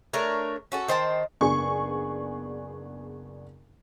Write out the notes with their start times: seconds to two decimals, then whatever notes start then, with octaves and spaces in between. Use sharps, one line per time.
0.13 A3 D4 A#4 C#5
0.72 C#4 F#4 A4
0.88 D#3 C5 G5 A5
1.41 F#1 B3 D4 G#4 C#6